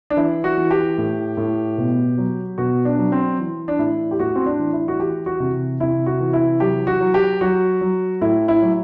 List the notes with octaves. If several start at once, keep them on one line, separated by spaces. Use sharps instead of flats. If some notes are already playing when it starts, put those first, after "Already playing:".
D4
E3 E4
F#4
E3
G4
A2
A2
B2
F#3
B2 F#4
D4
F#3
C4
E3
D4
A2 E4
G4
A2 F#4
C4
D4
E3
E4
F#4
E3 G4
F#4
C3
C3 E4
F#4
E3
E4
F#3 G4
F#4
F#3
G4
F#3 F#4
F#3
A2 E4
E4
F#3